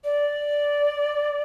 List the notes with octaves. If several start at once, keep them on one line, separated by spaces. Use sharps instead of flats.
D5